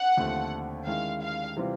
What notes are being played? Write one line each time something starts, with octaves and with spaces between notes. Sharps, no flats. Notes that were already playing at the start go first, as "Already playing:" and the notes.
Already playing: F#5
D#2 D3 F3 A3 C4
D#3 G#3 C#4 E4 F5
F5
C3 E3 G3 C4 F4